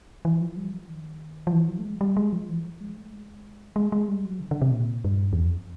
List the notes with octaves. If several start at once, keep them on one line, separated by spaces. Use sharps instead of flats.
E3
F3
G3
F3
D#3
F3
E3
F#3
A3
G#3
G3
G#3
F3
E3
F3
G#3
A3
G#3
G#3
G#3
G3
F#3
D3
D3
C3
A#2
G2
E2
F2